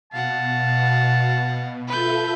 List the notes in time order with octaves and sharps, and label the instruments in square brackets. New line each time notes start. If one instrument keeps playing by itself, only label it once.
[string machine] B2 [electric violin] F5 F#5 [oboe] A5
[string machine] F4 A4 E5 [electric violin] B4 G6